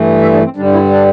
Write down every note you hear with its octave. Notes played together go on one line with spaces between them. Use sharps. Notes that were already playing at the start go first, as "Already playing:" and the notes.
Already playing: G2 E3 A3
E5
D4
C4
G2 D3 G3 D4
E4
D4